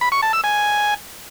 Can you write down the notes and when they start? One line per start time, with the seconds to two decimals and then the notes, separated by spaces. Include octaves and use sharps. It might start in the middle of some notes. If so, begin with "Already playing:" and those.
0.01 B5
0.12 C#6
0.23 A5
0.33 E6
0.44 G#5